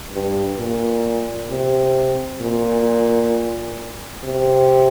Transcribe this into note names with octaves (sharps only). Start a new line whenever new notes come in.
G2
A#2
C3
A#2
C3